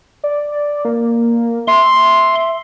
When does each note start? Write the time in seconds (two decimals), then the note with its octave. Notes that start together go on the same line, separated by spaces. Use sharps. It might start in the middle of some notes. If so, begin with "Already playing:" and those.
0.24 D5
0.85 A#3
1.67 E5 C6